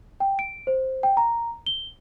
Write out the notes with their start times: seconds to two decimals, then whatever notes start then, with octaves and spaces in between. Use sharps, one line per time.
0.20 G5
0.39 D7
0.67 C5
1.03 G5
1.17 A#5
1.66 G7